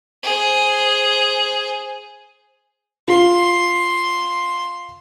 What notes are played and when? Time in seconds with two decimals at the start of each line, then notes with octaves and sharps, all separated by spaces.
0.23 G#4 C5
3.08 F4 C6